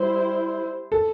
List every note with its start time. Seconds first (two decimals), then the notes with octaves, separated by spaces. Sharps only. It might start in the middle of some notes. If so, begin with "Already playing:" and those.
Already playing: G3 E4 C5
0.92 A4